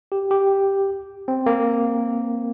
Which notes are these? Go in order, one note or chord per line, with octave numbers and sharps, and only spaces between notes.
G4
G4
C4
A#3